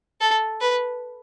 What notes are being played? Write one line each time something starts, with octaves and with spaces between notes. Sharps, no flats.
A4
B4